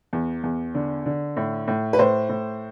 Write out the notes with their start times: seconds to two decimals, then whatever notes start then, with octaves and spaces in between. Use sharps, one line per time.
0.13 E2
0.43 E2
0.75 D3
1.06 D3
1.37 A2
1.68 A2
1.93 B4
1.99 A2 C5
2.29 A2